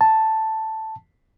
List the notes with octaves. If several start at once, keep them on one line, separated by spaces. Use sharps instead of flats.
A5